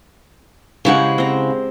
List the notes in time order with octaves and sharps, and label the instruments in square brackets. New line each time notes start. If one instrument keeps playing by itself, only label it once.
[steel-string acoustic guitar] C#3 E4 F#5 [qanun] G#3 G4 C5
[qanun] C4 A#5